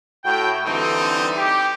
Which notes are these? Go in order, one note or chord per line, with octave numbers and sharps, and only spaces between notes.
A2 F#4 G5
D3 E3 G3 C4 D#4
G4